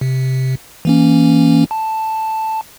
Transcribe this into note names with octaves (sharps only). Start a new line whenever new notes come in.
C3
E3 A#3 C#4
A5